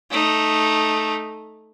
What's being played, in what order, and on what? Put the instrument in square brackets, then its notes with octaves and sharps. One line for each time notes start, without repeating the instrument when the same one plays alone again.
[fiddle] A3 D#4